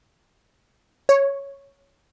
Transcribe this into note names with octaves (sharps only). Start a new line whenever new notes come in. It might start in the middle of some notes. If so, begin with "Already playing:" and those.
C#5